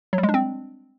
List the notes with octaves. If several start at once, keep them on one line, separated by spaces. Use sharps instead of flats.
F#3
G3
G#3
D4
C4